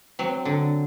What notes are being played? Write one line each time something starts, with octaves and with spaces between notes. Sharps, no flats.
F#3 C4
D3